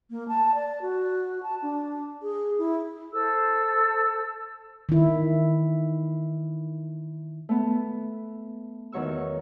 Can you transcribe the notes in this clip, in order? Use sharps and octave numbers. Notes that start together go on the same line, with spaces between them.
A#3
A5
D5
F#4
A5
D4
G#4
E4
A4 C5 E6
D#3 E4
A3 B3
E2 D#3 F#3 C#6 E6